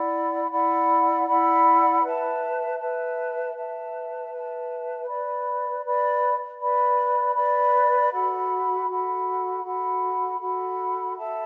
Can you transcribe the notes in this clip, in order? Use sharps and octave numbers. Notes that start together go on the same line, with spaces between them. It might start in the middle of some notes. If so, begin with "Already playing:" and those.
Already playing: E4 D5 F#5 B5
E4 D5 F#5 B5
E4 D5 F#5 B5
B4 E5 A5
B4 E5 A5
B4 E5 A5
B4 E5 A5
B4 D5 B5
B4 D5 B5
B4 D5 B5
B4 D5 B5
F#4 A4 F#5 B5
F#4 A4 F#5 B5
F#4 A4 F#5 B5
F#4 A4 F#5 B5
A4 E5 A5